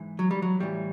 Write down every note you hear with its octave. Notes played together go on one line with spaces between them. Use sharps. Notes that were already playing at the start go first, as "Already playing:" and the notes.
Already playing: G#2 E3
F#3
G3
F#3
A2 E3 G3